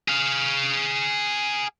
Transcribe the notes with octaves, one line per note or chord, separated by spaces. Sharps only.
G#4 F5